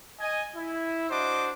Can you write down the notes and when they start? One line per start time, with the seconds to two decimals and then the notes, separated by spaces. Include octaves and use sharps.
0.20 D#5 G#5
0.55 E4
1.10 D4 F#4 C5 D#5 D6